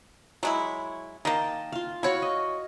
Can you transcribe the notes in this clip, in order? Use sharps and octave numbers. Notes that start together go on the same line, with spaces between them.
F#3 G#3 E4 C#5
D#3 A#3 D#5 G5 A5
F4 F5
E4 F#4 C#5 F5 C#6
D#5